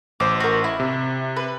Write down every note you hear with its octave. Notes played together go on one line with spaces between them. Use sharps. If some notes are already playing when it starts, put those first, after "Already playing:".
A1 C5 D6
F#4 A#4
E4
C3
B4